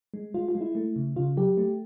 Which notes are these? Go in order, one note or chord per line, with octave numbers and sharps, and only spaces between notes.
G#3
G#3 F4
F4
G#3
E4
A3
C#3
C#3 F4
F#3 G4
A3